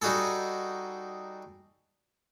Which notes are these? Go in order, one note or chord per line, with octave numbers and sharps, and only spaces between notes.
G3 D#4 F#4 G#4 A4